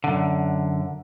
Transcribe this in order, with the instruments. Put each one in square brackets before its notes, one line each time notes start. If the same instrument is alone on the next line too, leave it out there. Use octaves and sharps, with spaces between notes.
[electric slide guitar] F#2 D3